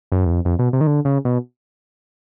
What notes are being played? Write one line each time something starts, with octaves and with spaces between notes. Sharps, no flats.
F#2
E2
F2
F2
B2
C3
D#3
D3
C#3
B2